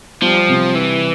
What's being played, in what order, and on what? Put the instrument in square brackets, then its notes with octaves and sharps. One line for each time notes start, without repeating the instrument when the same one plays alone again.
[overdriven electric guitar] F3 [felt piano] G3
[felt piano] C3
[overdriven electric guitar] E3